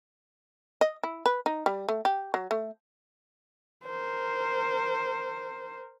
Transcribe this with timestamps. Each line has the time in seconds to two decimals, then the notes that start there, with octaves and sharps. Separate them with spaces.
0.81 D#5
1.03 E4
1.26 B4
1.46 D#4
1.66 G3
1.89 A3
2.05 G4
2.34 F#3
2.51 A3
3.85 A#4 C5